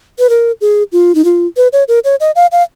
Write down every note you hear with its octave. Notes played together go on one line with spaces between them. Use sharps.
B4
A#4
G#4
F4
D#4
F4
B4
C#5
A#4
C#5
D#5
F5
F5